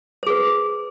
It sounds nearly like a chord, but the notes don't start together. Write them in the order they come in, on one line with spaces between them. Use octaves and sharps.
C5 G#4 B4